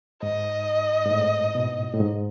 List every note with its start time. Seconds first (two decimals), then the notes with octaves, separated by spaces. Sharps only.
0.23 G#2 D#5
1.06 G#2
1.11 A2
1.55 B2
1.94 A2
2.00 G#2